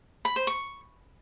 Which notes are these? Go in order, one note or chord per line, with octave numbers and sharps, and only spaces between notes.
B5
C5
C#6